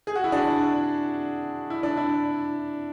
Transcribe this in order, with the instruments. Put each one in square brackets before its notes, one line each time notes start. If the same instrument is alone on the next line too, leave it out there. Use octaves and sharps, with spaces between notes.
[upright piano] G#4
F#4
E4
D4 F#4
E4
D4
E4